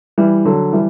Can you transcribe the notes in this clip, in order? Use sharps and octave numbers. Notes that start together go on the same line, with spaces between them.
E3 G3
D3 F#3
E3 G3